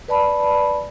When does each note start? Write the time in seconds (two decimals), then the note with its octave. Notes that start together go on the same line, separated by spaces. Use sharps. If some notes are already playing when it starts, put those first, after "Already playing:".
0.08 B4 D5 A5 B5